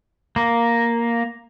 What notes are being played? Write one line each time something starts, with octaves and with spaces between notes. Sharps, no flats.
A#3